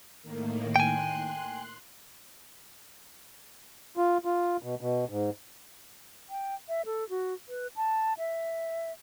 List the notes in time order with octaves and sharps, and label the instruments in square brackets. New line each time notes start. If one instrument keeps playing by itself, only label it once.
[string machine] A2 D#3 A#3
[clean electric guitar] G5 G#5 [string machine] C6 F#6
[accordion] F4
F4
B2
B2
G#2
[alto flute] G5
E5
A4
F#4
B4
A5
E5